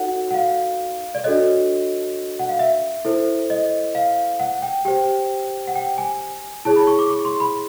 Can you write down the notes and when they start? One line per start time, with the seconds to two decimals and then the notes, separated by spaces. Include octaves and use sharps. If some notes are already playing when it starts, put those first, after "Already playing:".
Already playing: D#4 F#4 A4 C#5 F#5
0.31 F#5
0.34 F5
1.15 D5
1.24 D4 F#4 A4 C#5 D#5
2.39 F#5
2.49 F5
2.59 E5
3.05 E4 A4 C5
3.50 D#5
3.95 F5
4.40 F#5
4.62 G5
4.85 G4 C5 G5
5.68 F#5
5.75 G5
5.98 G#5
6.65 E4 G#4 C#5 A5
6.76 B5
6.87 C#6
6.99 D6
7.10 C#6
7.25 C6
7.40 B5